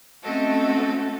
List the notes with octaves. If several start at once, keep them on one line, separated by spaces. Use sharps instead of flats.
A3 C4 C#4 F#4 A4 D#5